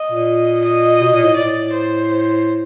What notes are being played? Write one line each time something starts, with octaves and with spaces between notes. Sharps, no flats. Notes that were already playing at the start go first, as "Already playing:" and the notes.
Already playing: D#5
A#2
D#5
B2
A#2
A2
A2 D5
C5